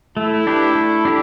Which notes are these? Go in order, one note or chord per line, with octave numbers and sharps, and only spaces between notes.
A3 E4
D4 G4 B4
A3
D4 G4